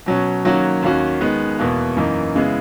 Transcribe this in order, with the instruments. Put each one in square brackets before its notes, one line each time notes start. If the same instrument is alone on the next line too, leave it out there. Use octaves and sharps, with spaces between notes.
[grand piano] B2 F#3 C#4
D#3 F#3 A#3 C#4 F#4
D#2 D#3 A#3 C#4 F#4
D#3 G#3 B3
E2 B2 A#3
F#2 E3 A#3 D#4
C#3 G#3 B3 E4